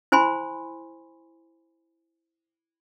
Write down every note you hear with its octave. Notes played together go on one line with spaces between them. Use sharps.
E4 C5 G#5 B5 C6